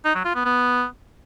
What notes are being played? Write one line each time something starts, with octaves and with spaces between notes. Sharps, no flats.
D#4
F#3
F4
B3
B3